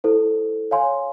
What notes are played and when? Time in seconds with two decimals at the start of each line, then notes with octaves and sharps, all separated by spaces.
0.04 E4 A4 C5
0.71 C#5 F5 G#5 C6